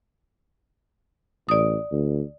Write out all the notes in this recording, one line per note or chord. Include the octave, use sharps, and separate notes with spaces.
A1 D5 D#6
D2